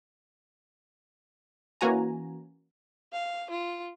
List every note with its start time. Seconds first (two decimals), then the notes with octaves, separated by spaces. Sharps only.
1.81 E3 A#3 C#4 F#4 G#5 A#5
3.13 F5
3.50 F4